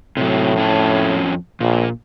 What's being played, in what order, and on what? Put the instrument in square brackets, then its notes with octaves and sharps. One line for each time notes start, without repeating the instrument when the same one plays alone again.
[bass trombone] A2 [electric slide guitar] C3 F#3
[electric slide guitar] F2 C#4 A5
[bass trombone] A#1 [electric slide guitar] A#2